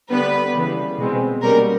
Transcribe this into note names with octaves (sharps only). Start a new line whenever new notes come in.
D3 G3 B3 B4
C#3 E3 G3
B2 G#3 C4
B2 G3 A#3 C#4 A#4